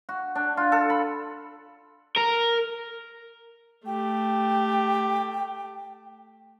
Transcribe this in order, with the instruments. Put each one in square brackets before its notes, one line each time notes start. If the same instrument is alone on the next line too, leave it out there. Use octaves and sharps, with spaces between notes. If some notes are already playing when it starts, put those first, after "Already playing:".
[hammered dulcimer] F#4
D4
F4
A4
B5
[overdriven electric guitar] A#4
[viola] A3 G4 [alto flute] G5